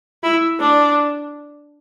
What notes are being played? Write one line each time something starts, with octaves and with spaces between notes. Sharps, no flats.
E4
D4